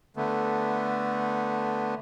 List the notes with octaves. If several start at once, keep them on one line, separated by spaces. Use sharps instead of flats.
D3 A3 B3